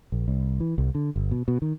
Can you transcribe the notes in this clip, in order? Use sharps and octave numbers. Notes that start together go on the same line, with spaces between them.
A#1
C2
E3
C2
D3
G1
B2
B2
D#3